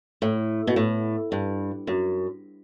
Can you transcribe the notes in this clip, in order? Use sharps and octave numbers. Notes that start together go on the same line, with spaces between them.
A2
B2
A2
G2
F#2